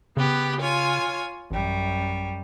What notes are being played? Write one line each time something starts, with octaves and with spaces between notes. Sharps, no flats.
C#3 B3 G4 F#6
F4 C#5 G#5
A1 F#2 G3